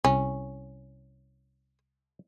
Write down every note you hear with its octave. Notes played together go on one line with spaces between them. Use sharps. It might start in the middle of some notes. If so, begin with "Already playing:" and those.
C2 C#4